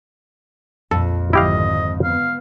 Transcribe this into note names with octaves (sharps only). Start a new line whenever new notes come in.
A#1 F2 F3 A4
G#1 D3 F3 E4 G4 D#5 F5
B3 F5